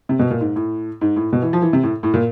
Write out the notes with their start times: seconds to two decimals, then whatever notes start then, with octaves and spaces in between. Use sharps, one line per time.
0.09 C3
0.19 B2
0.30 A#2
0.40 G#2
0.56 A2
1.01 G#2
1.16 A2
1.33 B2
1.42 E3
1.53 F3
1.62 E3
1.73 C3
1.83 A2
2.03 A2
2.14 A#2